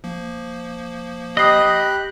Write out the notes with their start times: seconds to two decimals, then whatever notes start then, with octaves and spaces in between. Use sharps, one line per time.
0.04 F3 A#3
1.37 G4 D#5 B5 D#6 F#6 C7